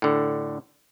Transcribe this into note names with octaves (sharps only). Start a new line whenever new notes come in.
A2 D3